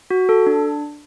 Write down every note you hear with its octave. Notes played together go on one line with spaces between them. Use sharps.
F#4
A4
D4